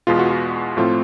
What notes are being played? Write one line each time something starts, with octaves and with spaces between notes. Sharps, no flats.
E2 B2 G#3 B3 F4
F#4
F4
A2 F3 A3 C4 F4